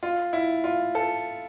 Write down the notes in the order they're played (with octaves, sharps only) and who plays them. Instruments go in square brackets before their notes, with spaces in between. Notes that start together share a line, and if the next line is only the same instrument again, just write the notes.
[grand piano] F4
E4
F4
A4